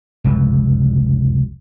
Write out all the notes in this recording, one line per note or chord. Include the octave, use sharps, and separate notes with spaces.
F1 C#2 F#2